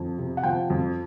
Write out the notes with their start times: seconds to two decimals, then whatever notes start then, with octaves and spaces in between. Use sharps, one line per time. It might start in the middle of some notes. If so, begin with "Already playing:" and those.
Already playing: F2
0.18 C3
0.37 F#5
0.43 F3 G5
0.70 F2